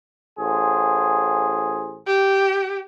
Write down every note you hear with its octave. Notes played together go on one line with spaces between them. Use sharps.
A1 G#4 C5
G4